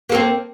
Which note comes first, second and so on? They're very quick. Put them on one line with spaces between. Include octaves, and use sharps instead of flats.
A#3 A4 C4